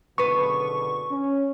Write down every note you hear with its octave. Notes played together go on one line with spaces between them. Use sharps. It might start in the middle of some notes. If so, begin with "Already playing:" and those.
F#1 B2 D3 B3 B4 C#6
C#4